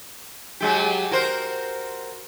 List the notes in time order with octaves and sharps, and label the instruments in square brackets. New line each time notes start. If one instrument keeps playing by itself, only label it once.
[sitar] F#3 G#3 G4
F#4 A#4 C5